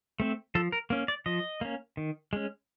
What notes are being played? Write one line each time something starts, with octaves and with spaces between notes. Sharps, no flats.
A3 C4
F3 A4
A#4
A#3 C#4
D5
F3 D#5
A#3 C#4
D#3
G#3 C#4